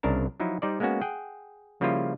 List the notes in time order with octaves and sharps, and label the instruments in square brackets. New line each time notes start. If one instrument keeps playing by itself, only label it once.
[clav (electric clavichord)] C2 C#3 D4 A#4 A5
F3 F#3 D#4 E4
G3 D#4 C5 D5
G#3 A#3 B3 C#4 F#4
G#4 F#5 G5
C#3 F3 G3 A#3 E4 F4